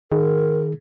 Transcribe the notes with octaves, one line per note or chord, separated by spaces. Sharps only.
D#3 G#4 A#4